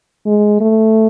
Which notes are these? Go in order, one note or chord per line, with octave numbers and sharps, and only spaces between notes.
G#3
A3